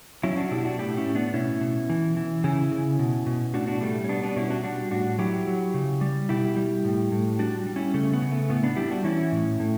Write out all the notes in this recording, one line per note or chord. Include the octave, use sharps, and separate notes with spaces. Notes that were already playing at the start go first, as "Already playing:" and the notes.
F#3 C#4 E4
D4 F#4
B2 E4 G4
D4 F#4
A2 E4 G4
C#4 E4
A2
B3 D4
B2 C#4 E4
B2
E3
E3
C#3 C#4 E4
C#3
B2
B2
A2 D4 F#4
D4 F#4
G3 A3
C#4
B2 B3 D4
B3 D4
B2 C#4 E4
D4 F#4
G3 D4 F#4
A2 D4 F#4
F#3 E4 G4
F#3
C#3
G3
B2 E4 G4
G3
A2
A2
G3 D4 F#4
G3
C#4 E4
C#3 A3 C#4
B3
C#3
A3
A2 B3
B3 D4
G3 E4 G4
D4 F#4
E3 C#4 E4
A2
A2